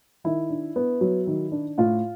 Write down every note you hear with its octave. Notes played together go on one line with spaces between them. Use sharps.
D#3 E4
D4
B3
F#3
D#3
D4
A2 F4